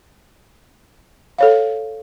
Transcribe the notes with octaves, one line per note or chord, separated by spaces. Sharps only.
A4 C#5 F5